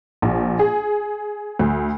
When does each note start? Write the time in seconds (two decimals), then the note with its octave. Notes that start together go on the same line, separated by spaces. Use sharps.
0.22 A#1
0.59 G#4
1.59 D2